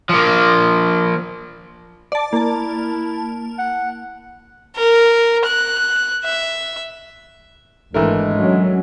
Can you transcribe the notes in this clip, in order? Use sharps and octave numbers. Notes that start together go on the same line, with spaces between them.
F3 A#3
D5 A5
A#3 E4 A5
F#5
A#4
F#6
E5
G#1 A#2 E3 G#3 A3 D4 A#4
F#3 C#4